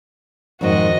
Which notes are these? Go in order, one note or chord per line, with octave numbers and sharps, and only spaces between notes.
F2 G#2 D#3 F#4 D#5